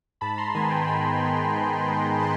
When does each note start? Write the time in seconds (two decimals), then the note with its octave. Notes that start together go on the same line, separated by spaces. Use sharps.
0.21 G#2 A5 B5
0.38 A#5 C6
0.55 D#3 G#3 B3 G#5 A#5
0.70 G5 A5
0.88 G#2 A5 B5
1.22 D#3 G#3 B3
1.54 G#2
1.87 D#3 G#3 B3
2.20 A5 B5